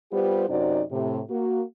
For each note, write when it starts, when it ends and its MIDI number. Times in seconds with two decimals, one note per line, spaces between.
0.12 0.47 55
0.12 0.47 59
0.12 0.47 65
0.12 0.47 67
0.12 0.47 72
0.49 0.81 42
0.49 0.81 48
0.49 0.81 63
0.49 0.81 66
0.49 0.81 72
0.49 0.81 74
0.91 1.21 45
0.91 1.21 48
1.30 1.63 58
1.30 1.63 66